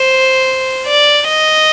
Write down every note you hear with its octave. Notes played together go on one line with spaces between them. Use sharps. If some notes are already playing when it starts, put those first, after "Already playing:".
Already playing: C5
D5
D#5